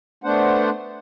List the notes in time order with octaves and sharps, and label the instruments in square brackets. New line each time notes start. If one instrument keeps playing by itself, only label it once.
[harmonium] A3 B3 D4 C5 F#5